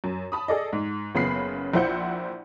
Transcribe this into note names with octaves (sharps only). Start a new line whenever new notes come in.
F#2
A5 B5 D#6
G#4 A4 D5 D#5
G#2
F#1 C#3 B3 B5 C7
A#1 E4 C5 F#5 G6 C#7